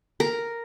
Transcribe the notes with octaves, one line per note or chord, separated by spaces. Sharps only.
A#4